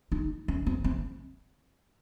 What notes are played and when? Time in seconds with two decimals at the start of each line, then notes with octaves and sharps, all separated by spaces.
0.12 D#4
0.48 C#4
0.66 C4
0.84 C4